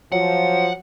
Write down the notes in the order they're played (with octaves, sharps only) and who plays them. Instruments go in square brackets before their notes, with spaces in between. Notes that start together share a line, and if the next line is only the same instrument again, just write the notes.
[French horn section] F3 [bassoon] F#3 [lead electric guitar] F#5